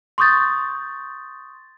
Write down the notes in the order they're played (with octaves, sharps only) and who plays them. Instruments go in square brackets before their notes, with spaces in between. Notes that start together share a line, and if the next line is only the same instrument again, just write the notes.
[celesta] C6 C#6 D#6 G6 A6